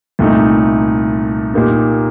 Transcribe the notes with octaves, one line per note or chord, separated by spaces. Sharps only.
C2 A#2 A3 D#4
A#2 G3 A#3 D#4